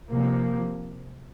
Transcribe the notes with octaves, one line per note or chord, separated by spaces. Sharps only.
C3 F3 A#3